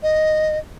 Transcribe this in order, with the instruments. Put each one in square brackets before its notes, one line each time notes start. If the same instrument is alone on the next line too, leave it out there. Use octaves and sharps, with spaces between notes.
[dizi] D#5